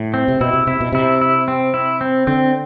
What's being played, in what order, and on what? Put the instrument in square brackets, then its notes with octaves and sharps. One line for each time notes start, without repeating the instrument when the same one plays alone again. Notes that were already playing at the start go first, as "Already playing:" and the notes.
Already playing: [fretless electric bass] A2
[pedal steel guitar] C4
[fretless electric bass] C3
[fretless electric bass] B2 [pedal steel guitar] E4
[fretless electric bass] C3
[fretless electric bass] C3 [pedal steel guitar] E4
[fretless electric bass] B2
[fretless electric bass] C3 [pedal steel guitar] E4
[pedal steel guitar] E4
C4
E4
C4
[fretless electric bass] D3 [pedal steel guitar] C4